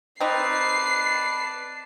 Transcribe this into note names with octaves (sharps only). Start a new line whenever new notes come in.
C4 D#4 B4 D5 A5 C7